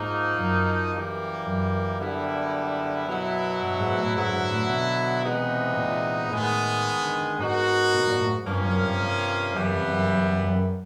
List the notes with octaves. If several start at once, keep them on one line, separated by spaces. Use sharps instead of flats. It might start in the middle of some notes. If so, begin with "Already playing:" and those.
Already playing: G#2 F3 A#3 D#4
F#2
E3 G3 A#3
F#2
D3 G3 B3 E4
B2 F#3 B3 E4
G2
G#2
A2
G#2 D3 F#3 B3 E4
G#2
A2
B2
C3 E3 G#3 B3 D#4
A#2
A2 D#3 G#3 B3
D3
D3
G#2 B3 D#4 F#4 A#4
B2
A#2
A2
G#2
G2 C3 F3 A#3 C#4
F#2
G2
G2
F#2 C#3 E3 G3 B3
F2
F#2
F#2
F#2
F#2